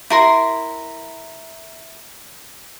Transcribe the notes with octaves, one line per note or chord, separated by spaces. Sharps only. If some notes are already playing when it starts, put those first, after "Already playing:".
E4 A#4 C6